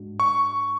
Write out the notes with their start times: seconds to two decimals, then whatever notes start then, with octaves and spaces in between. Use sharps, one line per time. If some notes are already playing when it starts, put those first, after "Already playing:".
Already playing: G#2 G#3 D4 F#4
0.20 C#6